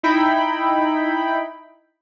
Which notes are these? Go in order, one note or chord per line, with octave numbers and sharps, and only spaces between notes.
D#4 E4 G5 B5